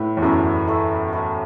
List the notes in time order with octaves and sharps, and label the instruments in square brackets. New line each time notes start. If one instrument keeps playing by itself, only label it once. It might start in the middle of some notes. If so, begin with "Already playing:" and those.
Already playing: [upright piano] A2 [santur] B4 E5
[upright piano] E2
[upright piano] F#2 [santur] E4 A4 C#5 E5
[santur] A3 E4 A4
A3 E4 A4